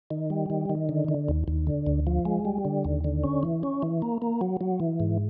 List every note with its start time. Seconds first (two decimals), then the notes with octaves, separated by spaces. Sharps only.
0.11 D#3
0.30 G3
0.50 D#3
0.69 D#3
0.89 D3
1.08 D3
1.29 D#2
1.48 D#2
1.67 D3
1.87 D2
2.07 F3
2.25 G#3
2.45 G3
2.65 D3
2.85 D#2
3.04 D3
3.24 C#4
3.43 E3
3.63 C#4
3.82 E3
4.02 A#3
4.22 A#3
4.41 F#3
4.61 F#3
4.80 E3
5.00 G#2